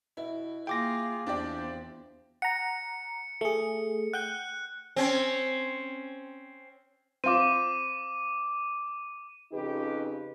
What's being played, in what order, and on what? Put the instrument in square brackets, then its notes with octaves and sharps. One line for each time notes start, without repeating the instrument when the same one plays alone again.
[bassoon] B2 [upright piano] E4
[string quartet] A#3 F4 [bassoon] G#4 [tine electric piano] G5 D6 A#6
[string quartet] E2 C4 [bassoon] F3 [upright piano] D4 G4 D5
[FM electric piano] F#5 A#5 [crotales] C#7
[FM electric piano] A3 G#4 [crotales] C#7
[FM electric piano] F#5 G5 G6 [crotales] F#6
[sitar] C4 C#4
[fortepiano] C4 F4 [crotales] D6 D#7
[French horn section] F2 C#3 D#4 G4 B4